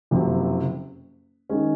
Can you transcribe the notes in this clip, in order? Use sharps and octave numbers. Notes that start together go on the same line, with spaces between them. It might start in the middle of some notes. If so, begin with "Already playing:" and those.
F#1 F2 C3 F#3
D#3 G#3 C#4